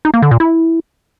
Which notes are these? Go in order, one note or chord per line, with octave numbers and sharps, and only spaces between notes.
D#4
A#3
D3
A#2
E4